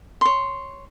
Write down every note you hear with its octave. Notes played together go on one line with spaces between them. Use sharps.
C#5 C6